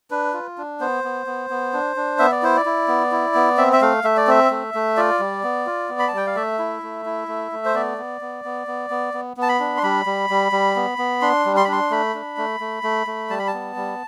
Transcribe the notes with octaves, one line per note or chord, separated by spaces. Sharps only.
D4 B4
F4
D4
B3 C5
B3
B3
B3
D4
D4
B3 E5
D5
E4 C5
D5
E4
B3
E4
B3
C4 E5
E5
A3 F5
A3 E5
D5
C4 E5
A3
A3
F4 D5
G3
B3
F4
B3
B5
A5
G3 G5
F5
A3 E5
E4
A3
E4
A3
A3
C5
B3 D5
B3
B3
B3
B3
B3
B3
B3
A5
B5
D4
C6
G3 B5
G3
G3
G3
B3
B3
D4 C6
G3
C6
B5
D4 C6
A3 B5
D4
A3
A3
A3
A3
G3 A5
B5
A5
B3
G3